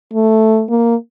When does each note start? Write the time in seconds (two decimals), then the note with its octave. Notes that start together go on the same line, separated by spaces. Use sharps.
0.13 A3
0.70 A#3